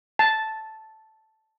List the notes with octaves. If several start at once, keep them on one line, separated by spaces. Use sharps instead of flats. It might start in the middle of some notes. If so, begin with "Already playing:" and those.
A5